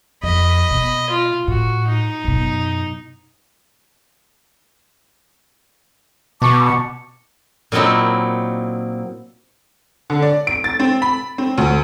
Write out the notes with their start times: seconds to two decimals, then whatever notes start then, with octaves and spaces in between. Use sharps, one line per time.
0.23 F2 D#5 B5
0.71 B2
1.10 F4
1.48 A2 F#4
1.88 D#4
2.24 F#2 B2
6.42 B2 A5 C#6 D6
7.72 A#2 F#3 C4 D#4 E4
10.10 D3
10.22 D5
10.47 D7
10.64 A6
10.80 C4
11.02 B5
11.38 C4
11.58 D2